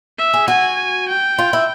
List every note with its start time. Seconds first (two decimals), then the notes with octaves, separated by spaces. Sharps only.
0.19 E5
0.34 G#4
0.48 F#4 G#5
1.09 G5
1.39 F4
1.53 E4